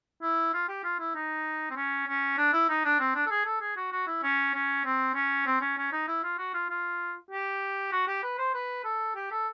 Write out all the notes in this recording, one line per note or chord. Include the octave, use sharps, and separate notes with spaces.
E4
F4
G4
F4
E4
D#4
C4
C#4
C#4
D4
E4
D#4
D4
C4
D4
A4
G#4
A4
G#4
F#4
F#4
E4
C#4
C#4
C4
C#4
C4
C#4
C#4
D#4
E4
F4
F#4
F4
F4
G4
F#4
G4
B4
C5
B4
A4
G4
A4